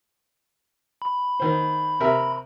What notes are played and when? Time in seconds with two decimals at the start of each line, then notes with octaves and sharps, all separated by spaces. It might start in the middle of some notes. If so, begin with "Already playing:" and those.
1.02 B5
1.40 D#3 C5
2.00 C3 A#4 E5